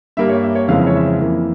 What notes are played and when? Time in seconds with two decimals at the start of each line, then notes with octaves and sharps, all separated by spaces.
0.17 G2 G3 A#3 E5
0.30 C#5
0.43 E5
0.55 C#5
0.68 F2 C#3 E3 G#3 F5
0.78 E5
0.87 C#5
0.96 E5
1.21 F2 E3 A#3